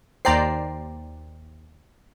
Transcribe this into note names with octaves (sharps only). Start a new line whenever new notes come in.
D#2 C5 D5 G5 A#5 C7